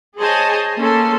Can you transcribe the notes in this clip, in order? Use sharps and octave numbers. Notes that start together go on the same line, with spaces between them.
G#4 C5 C#5 D#5 G#5 A5
A#3 C#4 A4 C6